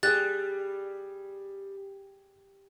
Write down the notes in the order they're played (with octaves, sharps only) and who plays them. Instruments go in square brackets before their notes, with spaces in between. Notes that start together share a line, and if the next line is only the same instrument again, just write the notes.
[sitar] G3 [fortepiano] G4 G#4 [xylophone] F#6 A6